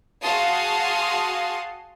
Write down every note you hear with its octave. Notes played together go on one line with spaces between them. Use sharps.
F#4 G#4 F5 A5 C6 D#6